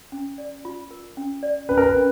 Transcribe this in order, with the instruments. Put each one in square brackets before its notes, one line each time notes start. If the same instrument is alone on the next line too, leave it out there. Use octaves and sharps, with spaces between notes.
[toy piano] C#4
D5
F4
A#4
C#4
D5
[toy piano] C#4 [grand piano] B4
[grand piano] A#4
B4
[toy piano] C#4